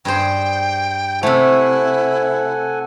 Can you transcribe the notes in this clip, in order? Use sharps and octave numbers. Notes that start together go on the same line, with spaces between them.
G2 G#4 C5 G5
C3 A3 E4 A4 C5 F#5 G#5